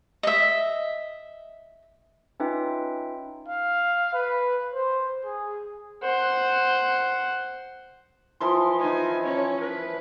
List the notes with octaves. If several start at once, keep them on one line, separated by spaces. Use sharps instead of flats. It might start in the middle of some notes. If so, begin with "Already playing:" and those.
D#5 E5
C#4 D#4 F4 B4 E5 G5
F5
B4
C5
G#4
C5 F#5
E3 F3 C6
D#4 G#5
C#4 C#5
B4